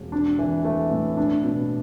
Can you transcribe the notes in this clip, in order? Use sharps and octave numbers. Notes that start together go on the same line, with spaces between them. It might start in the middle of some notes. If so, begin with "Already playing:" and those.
Already playing: E1
D4
E3
A3
A2
D4
B2